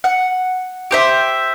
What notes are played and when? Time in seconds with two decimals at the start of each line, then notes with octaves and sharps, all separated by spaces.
0.04 F#5
0.91 G4 C5 E5